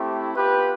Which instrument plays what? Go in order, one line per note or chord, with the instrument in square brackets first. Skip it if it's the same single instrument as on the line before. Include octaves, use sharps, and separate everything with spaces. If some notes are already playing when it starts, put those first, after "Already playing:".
Already playing: [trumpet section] A3 C4 E4 G4
B3 F4 G4 B4